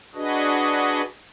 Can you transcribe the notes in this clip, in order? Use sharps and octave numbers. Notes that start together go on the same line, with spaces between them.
D4 F#4 G#4 B4 D#5